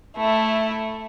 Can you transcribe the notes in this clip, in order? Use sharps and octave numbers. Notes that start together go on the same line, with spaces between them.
A3 E4